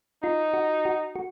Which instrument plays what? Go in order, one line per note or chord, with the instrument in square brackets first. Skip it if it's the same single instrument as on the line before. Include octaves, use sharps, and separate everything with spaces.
[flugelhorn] D#4 [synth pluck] F4
[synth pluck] F#4
F#4
F#4